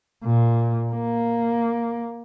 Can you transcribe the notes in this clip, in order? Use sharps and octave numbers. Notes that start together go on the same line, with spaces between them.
A#2
A#3